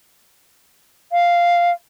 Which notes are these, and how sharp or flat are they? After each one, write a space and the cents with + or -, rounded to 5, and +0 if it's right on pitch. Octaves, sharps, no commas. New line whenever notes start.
F5 -5